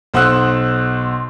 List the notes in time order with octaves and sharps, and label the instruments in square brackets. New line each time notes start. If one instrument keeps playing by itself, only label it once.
[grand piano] B1 C5 F#5 D#6 E6 F#6